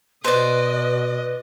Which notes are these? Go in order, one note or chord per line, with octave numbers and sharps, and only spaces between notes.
B2 B4 C5 D5 D#5